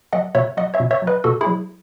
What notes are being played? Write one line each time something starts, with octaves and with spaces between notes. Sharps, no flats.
F#3 D#5 F#5
B2 C#5 E5
F#3 D#5 F#5
C#5 E5
B2
C#5 E5
F#3
B4 D#5
B2 F#4 A4
E4 G#4
F#3